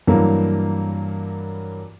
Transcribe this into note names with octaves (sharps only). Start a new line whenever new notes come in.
G2 E3 F#3 A#3